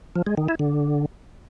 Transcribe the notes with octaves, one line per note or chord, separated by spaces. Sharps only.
F3
G#3
D#3
E4
D3